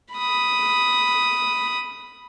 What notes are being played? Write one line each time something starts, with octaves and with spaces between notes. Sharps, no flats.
B5 D#6